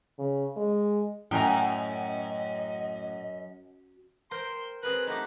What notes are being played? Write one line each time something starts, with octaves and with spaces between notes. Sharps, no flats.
C#3
G#3
F#2 A2 D#5 G5 G#5 A#5
A#4 C5 G5 C6
C4 G#4 A#4 B4
A3 D#4 F#4 G4